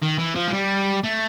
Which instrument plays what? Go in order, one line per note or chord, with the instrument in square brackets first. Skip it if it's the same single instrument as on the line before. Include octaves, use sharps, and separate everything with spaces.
[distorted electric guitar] D#3
E3
F3
G#3
G3
A3